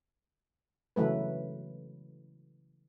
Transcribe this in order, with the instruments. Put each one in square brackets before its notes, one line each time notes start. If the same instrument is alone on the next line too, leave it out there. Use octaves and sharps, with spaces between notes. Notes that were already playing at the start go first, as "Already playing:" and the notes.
[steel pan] C#3 E3 F#3 A3 B4